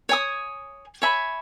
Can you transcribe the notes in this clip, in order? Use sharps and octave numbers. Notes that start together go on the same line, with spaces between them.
C#5 G#5 D#6
C#5 E5 G#5 B5